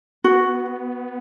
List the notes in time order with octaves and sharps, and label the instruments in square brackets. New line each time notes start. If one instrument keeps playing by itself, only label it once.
[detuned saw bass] B3 [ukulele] F#4